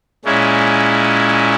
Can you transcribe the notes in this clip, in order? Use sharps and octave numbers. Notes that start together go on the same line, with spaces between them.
A#2 G#3 C#4 E4